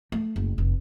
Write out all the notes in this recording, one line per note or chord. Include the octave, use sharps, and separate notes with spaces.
A3
F#1
F1